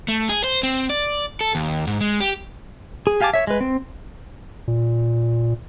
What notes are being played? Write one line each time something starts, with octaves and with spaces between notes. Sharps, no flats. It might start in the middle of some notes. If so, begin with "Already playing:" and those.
A3
G#4
C5
C4
D5
A4
D#2
G#2
G#3
G4
G#4
G4 F5 G#5 A5 D6
C#5 E5
G#3 B4
C4
A#2